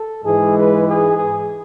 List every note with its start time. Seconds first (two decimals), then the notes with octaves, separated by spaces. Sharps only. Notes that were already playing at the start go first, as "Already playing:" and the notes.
Already playing: A4
0.24 G#2 E3 G#3 G#4
0.55 B4
0.86 G#4
1.17 G#4